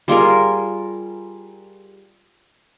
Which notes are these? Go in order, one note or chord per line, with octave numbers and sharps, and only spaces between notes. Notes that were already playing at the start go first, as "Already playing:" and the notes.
G3 F4 G#4 A#4